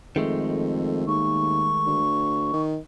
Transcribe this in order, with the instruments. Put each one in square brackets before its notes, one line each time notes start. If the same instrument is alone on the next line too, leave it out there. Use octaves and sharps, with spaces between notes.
[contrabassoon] F2 [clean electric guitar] D#3 G#3 A3
[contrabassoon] D#2 [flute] C#6
[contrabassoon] D2
D#3